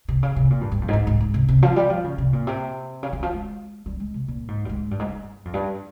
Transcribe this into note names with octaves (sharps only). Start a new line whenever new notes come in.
C3
C#3
C3
A#2
G2
G2
F2
G#2
G2
G#2
G#2
C3
C3
F3
G3
F3
C#3
C3
A#2
C3
C#3
D#3
F3
G#3
G3
G#3
C3
A#2
G#2
G2
G#2
G2
G#2
G2
F2
G2